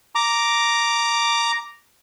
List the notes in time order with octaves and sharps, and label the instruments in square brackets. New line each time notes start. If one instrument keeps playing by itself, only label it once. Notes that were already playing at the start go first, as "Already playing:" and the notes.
[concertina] A#5 D6